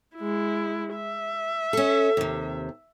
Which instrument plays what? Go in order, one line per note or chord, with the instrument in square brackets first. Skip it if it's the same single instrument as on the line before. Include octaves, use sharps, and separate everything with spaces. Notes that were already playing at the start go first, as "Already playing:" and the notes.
[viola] G#3 E4
E5
[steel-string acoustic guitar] C#4 A4
D#2 C3